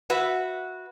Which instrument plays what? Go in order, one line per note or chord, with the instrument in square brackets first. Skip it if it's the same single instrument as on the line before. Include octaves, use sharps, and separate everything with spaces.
[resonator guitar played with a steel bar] F#4 B4 E5